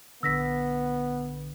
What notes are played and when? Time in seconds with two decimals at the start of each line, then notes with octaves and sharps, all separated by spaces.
0.23 A#1 D3 B3 E6 A#6 B6